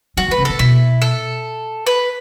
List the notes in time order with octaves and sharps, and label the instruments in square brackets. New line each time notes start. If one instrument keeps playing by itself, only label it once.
[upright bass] F#3 [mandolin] F#4
[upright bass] E3
[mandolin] B4
[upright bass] C#3
[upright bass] F#2 [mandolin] A4
[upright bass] B2 [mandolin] E4
[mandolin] A4
B4